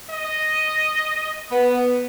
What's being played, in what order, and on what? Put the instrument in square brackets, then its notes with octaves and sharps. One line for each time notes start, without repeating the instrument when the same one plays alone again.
[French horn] D#5
[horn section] B3